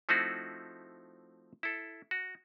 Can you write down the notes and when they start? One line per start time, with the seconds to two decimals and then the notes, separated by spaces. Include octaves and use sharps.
0.09 F3 A3 C4 D#4 E4 F#4
1.63 E4 A4
2.11 F#4